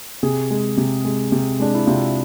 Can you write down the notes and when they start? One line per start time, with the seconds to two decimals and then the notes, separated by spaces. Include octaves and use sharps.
0.23 C3 G#4
0.50 G#3
0.77 C3
1.05 G#3
1.32 C3
1.60 G#3 D4
1.74 E4
1.86 C3 F4